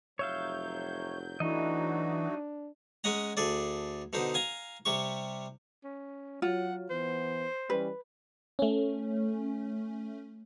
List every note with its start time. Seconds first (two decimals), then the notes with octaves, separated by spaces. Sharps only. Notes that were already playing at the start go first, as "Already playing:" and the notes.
0.19 F1 F#3 C#5 E5 F5 G6
1.40 E3 F#3 A3 D4 D#4 F#4 D#5
3.04 G#3 C#4 D#5 F#5 A#5
3.37 D2 G#4 A4 D5
4.13 B2 D3 D#4 C5
4.34 F5 G#5 A#5
4.85 C3 G3 C#6
5.84 C#4
6.42 F#3 F4 F#5
6.90 E3 B3 C5
7.70 E3 G3 C#4 B4
8.59 A3 C#4